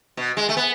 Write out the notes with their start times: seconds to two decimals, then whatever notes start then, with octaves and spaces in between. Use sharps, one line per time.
0.17 B2
0.37 G#3
0.49 A3
0.57 B3